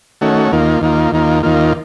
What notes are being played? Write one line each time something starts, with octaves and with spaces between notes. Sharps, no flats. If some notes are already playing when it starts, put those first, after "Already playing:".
D#3 A3 C#4 F#4
D#2 D#3 A#3 F4
D#2 D#3 A#3 F4
D#2 D#3 A#3 F4
D#2 D#3 A#3 F4